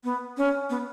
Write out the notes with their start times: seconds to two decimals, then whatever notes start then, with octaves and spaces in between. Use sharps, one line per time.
0.04 B3
0.37 C#4
0.70 B3